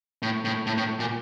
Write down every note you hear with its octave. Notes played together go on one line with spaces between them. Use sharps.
A2
A2
A2
A2
A#2